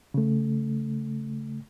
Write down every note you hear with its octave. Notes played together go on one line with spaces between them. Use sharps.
C#3 A3